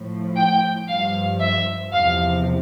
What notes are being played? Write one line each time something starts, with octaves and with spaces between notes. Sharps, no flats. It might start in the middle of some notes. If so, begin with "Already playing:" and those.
Already playing: A2 F3
G5
G2 F3 F5
E5
E2 C3 F3 F5